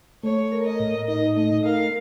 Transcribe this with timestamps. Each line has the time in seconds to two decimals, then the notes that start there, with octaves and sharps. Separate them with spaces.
0.23 A3 C#5
0.52 A#4
0.66 D#5
0.80 A2
1.08 D#4 D#5
1.37 A3 D#5
1.65 A#4 F5